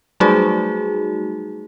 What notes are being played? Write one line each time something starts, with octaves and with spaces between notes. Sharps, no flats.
F#3 G3 A3 D#4 F#4 G#4